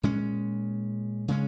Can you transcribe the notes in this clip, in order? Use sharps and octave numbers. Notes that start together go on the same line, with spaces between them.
A#2 G#3 C#4
C#3 G#3 C#4